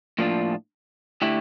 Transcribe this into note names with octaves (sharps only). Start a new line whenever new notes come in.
A2 F3 A#3 D4 F4
D3 A3 E4 G4